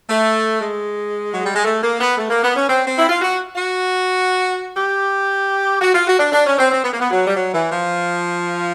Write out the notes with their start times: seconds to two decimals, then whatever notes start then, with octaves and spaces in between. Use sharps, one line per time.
0.10 A3
0.61 G#3
1.33 F#3
1.44 G3
1.55 G#3
1.65 A3
1.83 A#3
2.01 B3
2.18 A3
2.30 A#3
2.44 B3
2.56 C#4
2.69 C4
2.87 C4
2.99 E4
3.09 F4
3.22 F#4
3.55 F#4
4.77 G4
5.81 F#4
5.95 F4
6.08 F#4
6.19 D4
6.32 D4
6.46 C#4
6.59 C4
6.71 C4
6.84 B3
6.93 A#3
7.00 B3
7.11 F#3
7.27 G3
7.36 F#3
7.54 E3
7.72 F3